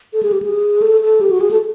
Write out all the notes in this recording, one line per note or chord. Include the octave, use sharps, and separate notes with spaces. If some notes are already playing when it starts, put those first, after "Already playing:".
A4
G#4
G4
G#4
A4
A4
G4
F#4
G#4
A4